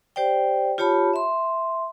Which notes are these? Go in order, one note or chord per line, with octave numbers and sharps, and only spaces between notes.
G4 C5 D5 G5
F4 G4 C#5 A5 B5
E5 C6